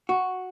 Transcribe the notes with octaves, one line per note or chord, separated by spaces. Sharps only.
F#4